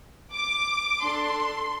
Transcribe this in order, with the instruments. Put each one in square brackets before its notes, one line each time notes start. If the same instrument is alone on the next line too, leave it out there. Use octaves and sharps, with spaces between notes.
[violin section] D6
D4 A4 C6